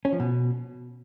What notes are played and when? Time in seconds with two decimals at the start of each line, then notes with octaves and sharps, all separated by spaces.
0.05 C#4
0.12 F3
0.20 B2